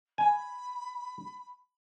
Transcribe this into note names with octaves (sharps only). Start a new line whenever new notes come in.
G#5 B5